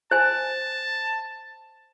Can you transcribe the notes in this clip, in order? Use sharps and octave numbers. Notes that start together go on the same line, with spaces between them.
C5 G#5 A5